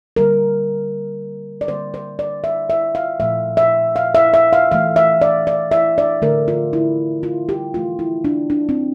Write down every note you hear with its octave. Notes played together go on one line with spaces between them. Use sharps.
D3 G3 A#3 A#4
D5
D3 G3 A#3 C5
C5
D5
E5
E5
F5
A#2 F3 A3 E5
E5
F5
E5
E5
F5
E3 A3 F5
E5
D5
D5
E5
D5
D3 A3 A#4
F4
E4
F4
G4
E3 A3 F4
E4
D4
D4
C4